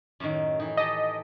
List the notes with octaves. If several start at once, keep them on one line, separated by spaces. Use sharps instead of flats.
F#2 A2 D#3
E3 D#4
G4 A4 D#5